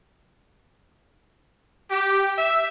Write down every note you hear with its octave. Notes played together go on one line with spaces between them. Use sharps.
G4
E5